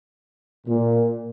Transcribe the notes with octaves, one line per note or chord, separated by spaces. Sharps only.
A#2